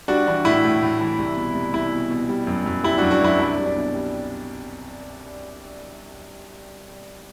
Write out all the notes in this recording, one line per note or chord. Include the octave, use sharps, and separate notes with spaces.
G3 D4 F#4
E3 D4
A2 E4
A2
A2
E3
C2
B2
C2
C2 E4
B2
B2
G3
F#2
F#2
G3 E4
F#2 D4 F#4
D4 F#4
F#2 E4
C2 D4
C2
D4
B2
G3